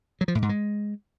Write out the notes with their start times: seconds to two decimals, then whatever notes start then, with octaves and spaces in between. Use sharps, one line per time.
0.21 F#3
0.28 F3
0.35 A2
0.42 G#2
0.49 G#3